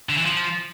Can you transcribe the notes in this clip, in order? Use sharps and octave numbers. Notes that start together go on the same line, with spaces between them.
D3
E3
F3